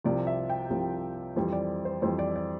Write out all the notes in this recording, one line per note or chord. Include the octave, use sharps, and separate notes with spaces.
C2 C3 F3 D5
E5
G5
C2 C3 F3
F2 E3 G3 C5
D5
C5
F2 E3 G3 C5
D5
D5